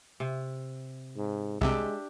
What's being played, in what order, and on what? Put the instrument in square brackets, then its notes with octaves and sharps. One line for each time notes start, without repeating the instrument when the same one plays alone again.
[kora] C3
[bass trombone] G#2
[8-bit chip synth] C2 C3 [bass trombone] G#3 [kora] D4 G4 E5